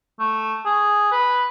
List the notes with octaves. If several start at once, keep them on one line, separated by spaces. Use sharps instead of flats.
A3
G#4
B4